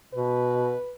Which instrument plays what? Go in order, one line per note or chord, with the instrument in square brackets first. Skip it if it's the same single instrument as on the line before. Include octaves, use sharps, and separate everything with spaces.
[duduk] B2 [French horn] B4